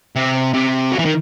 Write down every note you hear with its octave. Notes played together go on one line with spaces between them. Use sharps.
C3
C3
F#3
E3
D#3